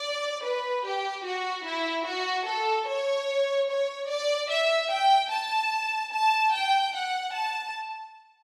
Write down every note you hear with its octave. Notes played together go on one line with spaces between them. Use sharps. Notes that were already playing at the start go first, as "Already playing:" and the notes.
Already playing: D5
B4
G4
F#4
E4
F#4
A4
C#5
C#5
D5
E5
G5
A5
A5
G5
F#5
A5